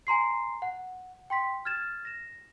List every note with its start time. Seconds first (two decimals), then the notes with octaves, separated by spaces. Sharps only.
0.07 G#5 A#5 C6 C7
0.62 F#5
1.30 G5 C6 B6
1.65 F6 G#6 A6 E7
2.05 A#6 E7